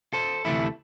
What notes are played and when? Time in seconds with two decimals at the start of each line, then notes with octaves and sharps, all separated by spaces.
0.13 A4 C5
0.45 D2 C3 E3 A3 E4